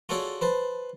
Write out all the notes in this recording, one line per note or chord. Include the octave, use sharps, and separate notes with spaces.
F4 F#4 G#4 A4 C#5 D5
B4 C5 A5